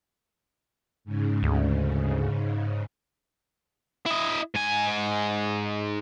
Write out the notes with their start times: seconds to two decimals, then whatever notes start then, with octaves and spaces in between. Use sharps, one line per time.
1.05 G#2 C#3
1.43 D2
4.06 E4 D#5
4.55 G#2 G#5